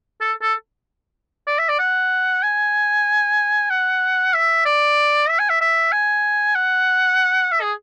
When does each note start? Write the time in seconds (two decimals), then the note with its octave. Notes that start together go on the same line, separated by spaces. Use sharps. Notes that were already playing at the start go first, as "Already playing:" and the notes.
0.21 A4
0.42 A4
1.47 D5
1.59 E5
1.69 D5
1.79 F#5
2.43 G#5
3.70 F#5
4.34 E5
4.65 D5
5.29 E5
5.39 G#5
5.49 E5
5.61 E5
5.92 G#5
6.55 F#5
7.52 E5
7.62 G#4